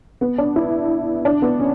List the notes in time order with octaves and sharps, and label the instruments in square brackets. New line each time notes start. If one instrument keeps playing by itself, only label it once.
[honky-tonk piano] B3
D4
E4
D4
B3
C#4